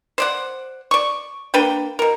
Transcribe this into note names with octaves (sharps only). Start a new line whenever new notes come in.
C5 D5 F#5
D5 C#6
A#3 D4 B4 G5
B2 A#4